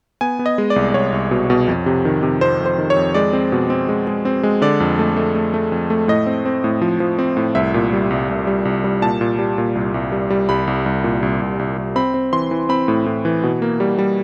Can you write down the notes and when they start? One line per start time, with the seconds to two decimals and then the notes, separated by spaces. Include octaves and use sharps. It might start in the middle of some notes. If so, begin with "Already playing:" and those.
0.21 B3 G#5
0.39 B3
0.46 D#5
0.58 G#3
0.70 D5
0.76 C2
0.94 C2 C#5
1.12 C2
1.31 B2
1.50 B2
1.68 F2
1.86 C3
2.05 D#3
2.23 C3
2.41 F2 C5
2.60 F2
2.66 C5
2.78 D#3
2.90 C#5
2.97 F2
3.14 G#3 D5
3.33 C4
3.52 B2
3.70 C4
3.89 G#3
4.07 G#3
4.25 C4
4.43 G#3
4.62 D3 D5
4.80 F2
4.99 A3
5.17 A3
5.35 A3
5.54 A3
5.72 F2
5.90 A3
6.08 A2 D#5
6.26 C4
6.46 C4
6.64 A2
6.81 F3
7.00 F3
7.19 C4
7.37 A2
7.55 C2 E5
7.74 A#2
7.93 G3
8.10 C2
8.29 C2
8.47 G3
8.65 C2
8.84 G3
9.02 A#2 A5
9.21 A#2
9.39 G3
9.58 A#2
9.75 C2
9.94 C2
10.12 G3
10.30 G3
10.49 C2 B5
10.67 C2
10.86 C2
11.04 A#2
11.23 C2
11.42 C2
11.59 C2
11.78 C2
11.96 C4 B5
12.14 C4
12.32 E3 C6
12.51 E3
12.69 C4 B5
12.88 A2
13.06 A2
13.25 E3
13.43 B2
13.62 A#3
13.80 G3
13.99 G3